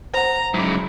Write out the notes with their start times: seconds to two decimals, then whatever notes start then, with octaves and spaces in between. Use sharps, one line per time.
0.14 C5 F#5 A#5
0.54 G#2 C#3 F#3 E4 D6